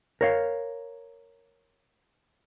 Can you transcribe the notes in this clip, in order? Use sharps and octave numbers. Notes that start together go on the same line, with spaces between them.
A#4 C#5 F5